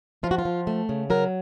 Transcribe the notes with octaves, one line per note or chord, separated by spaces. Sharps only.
F3 F4
F#4
F4
F3
A3
C#3
F#3 A#4